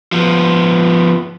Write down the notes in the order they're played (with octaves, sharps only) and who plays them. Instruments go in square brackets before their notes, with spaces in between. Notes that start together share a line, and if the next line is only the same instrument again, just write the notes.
[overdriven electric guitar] F3 B3